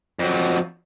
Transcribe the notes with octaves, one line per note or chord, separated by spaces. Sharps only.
F2 F#3